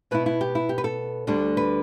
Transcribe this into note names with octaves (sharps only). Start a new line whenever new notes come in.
B2 B3 E4 B4
E4
G4
E4
G4
B4
A4
D2 D3 G3 D4
B4